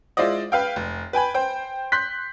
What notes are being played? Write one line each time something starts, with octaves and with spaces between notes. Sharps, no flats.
G#3 E4 F4 C5 D5 D#5
B4 F5 G5
F1
B4 G5 G#5 B5
C5 G5
C6 F#6 G6 B6